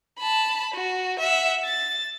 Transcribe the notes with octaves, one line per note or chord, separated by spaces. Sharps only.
A5 B5
F#4
E5 F#5
A6